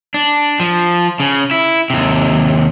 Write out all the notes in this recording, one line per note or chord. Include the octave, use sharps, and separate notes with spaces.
D4
F3
C#3
E4
D#2 C3